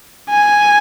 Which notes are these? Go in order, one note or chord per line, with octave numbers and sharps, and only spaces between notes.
G#5